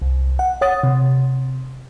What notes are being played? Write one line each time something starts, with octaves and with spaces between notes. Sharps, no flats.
C2
F#5
C#5 F#5 D#6 A6
C3